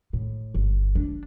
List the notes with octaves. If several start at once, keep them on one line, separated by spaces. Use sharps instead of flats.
A2
G1
D4